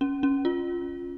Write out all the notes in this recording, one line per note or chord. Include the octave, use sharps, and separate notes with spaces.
C#4
C#4
F4